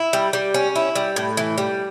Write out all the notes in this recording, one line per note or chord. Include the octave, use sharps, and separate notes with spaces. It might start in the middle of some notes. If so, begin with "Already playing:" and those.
Already playing: E4
G3
G3
C#4
E4
G3
A2
E3
G3